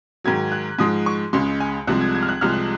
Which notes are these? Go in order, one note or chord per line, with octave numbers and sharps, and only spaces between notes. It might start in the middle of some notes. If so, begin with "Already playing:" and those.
G#2 D#3 F#3 G#6
F#6
G#2 F3 G#3 D#6
C#6
C#2 C#3 G#3 C6
G#5
C2 C3 F3 G#3 F#6
G#6
G#6
F6
F#6
C2 C3 F3 G#3 F6
F#6